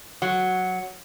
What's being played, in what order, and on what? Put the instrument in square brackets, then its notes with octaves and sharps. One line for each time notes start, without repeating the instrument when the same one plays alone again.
[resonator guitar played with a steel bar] F#3 F#4